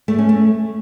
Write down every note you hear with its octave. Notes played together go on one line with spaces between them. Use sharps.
A3
C#4
A3